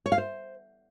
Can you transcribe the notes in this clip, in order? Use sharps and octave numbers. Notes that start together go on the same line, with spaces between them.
C#5
F5
C5